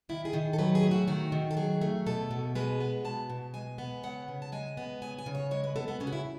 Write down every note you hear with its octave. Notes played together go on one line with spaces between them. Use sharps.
D#3 E4
G#4
D#3
A4
F#3 B4
G#4
A3
F#4
D#3 F#4
D#3
A4
F#3 G#4
A3
B2 A4
B2
G#3 B4
B3
B2 A5
B2
G#3 G#5
B3
C#3 F#5
C#3
A5
G#3 G#5
B3
C#3 G#5
G#5
C#3
C#5
G#3 C#5
B4
B3 A4
B3
C#3 C#4
F#4
E4